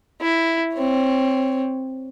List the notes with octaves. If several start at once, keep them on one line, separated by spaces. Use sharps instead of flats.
E4
C4 C#5